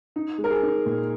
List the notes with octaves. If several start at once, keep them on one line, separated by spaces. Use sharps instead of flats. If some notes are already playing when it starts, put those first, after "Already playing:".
D#4
G#3
A#4
G#4
D#4
A#2